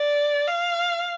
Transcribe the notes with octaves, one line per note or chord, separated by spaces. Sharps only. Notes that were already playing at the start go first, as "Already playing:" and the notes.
Already playing: D5
F5